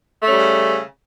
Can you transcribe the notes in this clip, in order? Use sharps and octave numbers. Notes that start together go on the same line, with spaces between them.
C#3 G3 A3 C#4